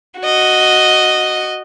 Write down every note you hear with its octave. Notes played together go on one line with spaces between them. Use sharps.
F#4 D#5